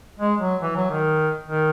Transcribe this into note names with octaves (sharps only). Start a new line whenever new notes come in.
G#3
F#3
E3
F#3
D#3
D#3